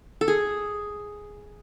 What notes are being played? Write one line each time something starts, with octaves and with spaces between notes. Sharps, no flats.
A4
G#4